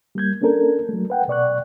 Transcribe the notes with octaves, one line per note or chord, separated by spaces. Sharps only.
G3 A#3 G6 G#6
A#3 C#4 D4 A4 A#4
F#3 A3
B4 F#5 G5
B2 D5 C#6 F#6